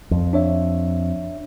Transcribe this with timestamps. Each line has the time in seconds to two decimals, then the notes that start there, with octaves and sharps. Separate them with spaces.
0.11 F2
0.33 D4 C#5 E5